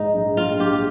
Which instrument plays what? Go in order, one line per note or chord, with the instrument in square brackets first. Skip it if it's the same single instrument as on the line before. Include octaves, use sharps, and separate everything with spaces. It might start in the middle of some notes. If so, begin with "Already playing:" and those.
Already playing: [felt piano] A#1 G#2 [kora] D#4
[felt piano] A#1
[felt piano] A#1 [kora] F4
[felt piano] A#1 [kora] G4